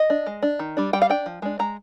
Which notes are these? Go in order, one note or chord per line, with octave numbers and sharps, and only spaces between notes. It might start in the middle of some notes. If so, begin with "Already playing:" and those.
Already playing: D#5
D4
G#3
D4
D#3
G3 D4
G3 G5
F5
D4 G5
F3
G#3 D4
G#3 A#5